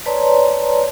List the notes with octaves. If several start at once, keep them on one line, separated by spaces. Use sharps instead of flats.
B4 C#5 D5 A5 A#5 C6